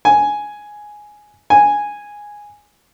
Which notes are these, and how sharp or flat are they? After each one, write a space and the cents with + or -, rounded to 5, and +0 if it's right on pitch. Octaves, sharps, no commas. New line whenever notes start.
G#5 +5
G#5 -5